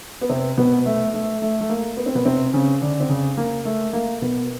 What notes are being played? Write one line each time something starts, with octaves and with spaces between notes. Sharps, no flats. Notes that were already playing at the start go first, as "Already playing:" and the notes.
B3
C3 C4
B2 B3
A3
A3
A3
A3
A#3
B3
C4
B2 B3
C3 C4
C#3 C#4
D3 D4
C4
C#3 C#4
A#3
A3
A#3
B2 B3